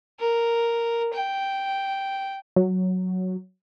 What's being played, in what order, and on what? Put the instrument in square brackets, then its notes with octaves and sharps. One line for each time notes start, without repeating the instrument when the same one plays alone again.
[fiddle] A#4
G5
[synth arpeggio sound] F#3